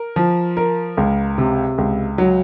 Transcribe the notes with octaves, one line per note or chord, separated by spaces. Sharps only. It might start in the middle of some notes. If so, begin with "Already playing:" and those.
Already playing: A#4
F3
A#4
C#2
C3
C#2
F#3